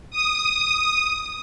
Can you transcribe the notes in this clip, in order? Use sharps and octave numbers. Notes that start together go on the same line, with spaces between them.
D#6